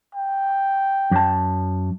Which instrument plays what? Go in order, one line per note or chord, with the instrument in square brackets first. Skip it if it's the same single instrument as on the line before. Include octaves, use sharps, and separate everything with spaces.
[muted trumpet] G5
[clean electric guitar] F#2 A5